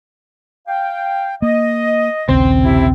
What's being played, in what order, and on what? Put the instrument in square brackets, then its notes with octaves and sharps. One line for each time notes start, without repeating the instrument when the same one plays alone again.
[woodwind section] F5 G5
[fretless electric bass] A#3 [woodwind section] D#5
[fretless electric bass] A#1 D#2 C#3 [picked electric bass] C4
[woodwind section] C3 E4